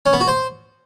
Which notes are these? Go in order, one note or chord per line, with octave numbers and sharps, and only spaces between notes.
C#4
B3
F#4
C5